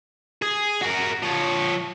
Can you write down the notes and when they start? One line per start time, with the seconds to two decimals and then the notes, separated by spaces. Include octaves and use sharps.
0.42 G#4
0.82 F#4 A#4
1.23 F3 C#5